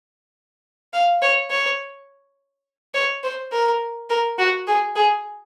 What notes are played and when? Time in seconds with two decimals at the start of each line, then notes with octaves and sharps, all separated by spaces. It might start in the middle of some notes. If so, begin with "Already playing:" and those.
0.93 F5
1.22 C#5
1.50 C#5
2.94 C#5
3.23 C5
3.52 A#4
4.10 A#4
4.38 F#4
4.67 G#4
4.96 G#4